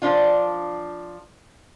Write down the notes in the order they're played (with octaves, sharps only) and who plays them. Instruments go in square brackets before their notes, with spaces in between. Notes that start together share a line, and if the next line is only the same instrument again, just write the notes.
[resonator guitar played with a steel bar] F3 D4 F4